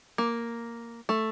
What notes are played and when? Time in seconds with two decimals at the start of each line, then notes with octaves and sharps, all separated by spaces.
0.18 A#3
1.09 A3